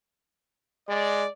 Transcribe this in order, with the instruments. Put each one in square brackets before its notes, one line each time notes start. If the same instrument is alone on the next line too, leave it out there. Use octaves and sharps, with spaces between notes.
[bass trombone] G#3 [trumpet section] D5